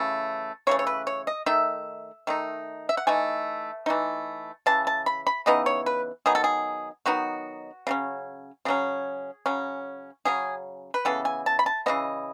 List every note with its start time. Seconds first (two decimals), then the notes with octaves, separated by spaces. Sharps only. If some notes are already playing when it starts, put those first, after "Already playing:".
Already playing: C#3 E3 A3
0.67 C#3 E3 A3 C#5
0.79 C#5
0.87 B4
1.07 C#5
1.27 D#5
1.46 D#3 A3 D#4 E5
2.27 D#3 A3 D#4
2.89 E5
2.97 F#5
3.07 E3 A3 D#4 G#5
3.86 E3 A3 D#4
4.66 C#3 E3 A5
4.87 A5
5.06 B5
5.27 B5
5.46 C#3 E3 B3 D#4 D#5
5.66 C#5
5.86 B4
6.26 D#3 F#3 B3 D#4 G#4
6.35 A4
6.44 G#4
7.06 D#3 F#3 B3 D#4 F#4
7.87 C#3 F#3 C#4
8.65 C#3 F#3 C#4 G#4
9.46 C#3 F#3 C#4
10.25 C#3 F#3 C#4 G#4
10.94 B4
11.05 C#3 E3 B3 A4
11.25 G#5
11.46 A5
11.59 B5
11.66 A5
11.86 C#3 E3 B3 D#5